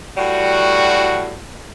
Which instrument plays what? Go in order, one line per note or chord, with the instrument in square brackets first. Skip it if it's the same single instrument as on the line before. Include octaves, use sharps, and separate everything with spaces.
[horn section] A2 G3 F#4